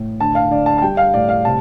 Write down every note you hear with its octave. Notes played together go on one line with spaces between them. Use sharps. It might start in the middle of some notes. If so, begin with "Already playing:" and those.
Already playing: A2
D3 A5
F5
D3 D5
A5
A5
G3 G5
F5
A2 D5
F5
C3 A5